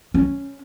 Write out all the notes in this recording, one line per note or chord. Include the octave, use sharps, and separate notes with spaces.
C#4